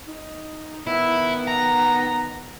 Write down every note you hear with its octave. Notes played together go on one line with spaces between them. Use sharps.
D#4
D#3 B3 E4
A#5